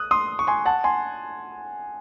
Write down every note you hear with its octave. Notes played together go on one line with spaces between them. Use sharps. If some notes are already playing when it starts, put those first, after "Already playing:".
Already playing: D#6 F#6
C6 D#6
C#6
G#5 C6
F#5 A5
G#5 C6